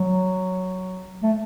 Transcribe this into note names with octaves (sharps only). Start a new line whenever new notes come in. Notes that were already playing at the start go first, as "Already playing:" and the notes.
Already playing: F#3
A3